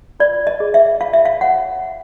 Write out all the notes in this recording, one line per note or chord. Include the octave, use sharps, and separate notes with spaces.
F4 D5
D#5
G#4
E5
F4 F5
E5
F5
C#5 F#5